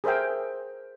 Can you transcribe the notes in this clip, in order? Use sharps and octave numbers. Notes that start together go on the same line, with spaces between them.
G#4 A#4 C5 E5 G5